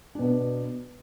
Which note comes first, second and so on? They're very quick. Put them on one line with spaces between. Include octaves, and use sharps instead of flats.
D4 B2 B3